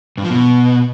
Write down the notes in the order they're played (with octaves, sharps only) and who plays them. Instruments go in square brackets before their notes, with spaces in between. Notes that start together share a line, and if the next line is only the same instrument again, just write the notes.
[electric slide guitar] G2
F3
B2